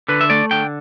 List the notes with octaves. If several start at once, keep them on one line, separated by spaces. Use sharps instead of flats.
D3 B4
E5
A3 D5
D3 G5